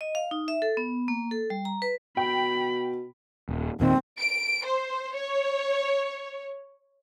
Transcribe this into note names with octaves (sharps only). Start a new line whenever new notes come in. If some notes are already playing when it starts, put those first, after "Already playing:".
D#5
F5
D#4
E5
A4
B3
A#3
A4
G3
A#5
B4
B2 G5 B5
D#1
E1 A#2 D#3 C4
D7
C5
C#5